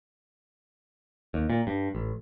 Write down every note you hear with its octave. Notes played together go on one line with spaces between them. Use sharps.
D#2
A#2
G2
A1